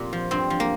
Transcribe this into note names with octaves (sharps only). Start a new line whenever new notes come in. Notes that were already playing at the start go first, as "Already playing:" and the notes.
Already playing: F2 A#2 G4
F3
G2 C4
F3
A#3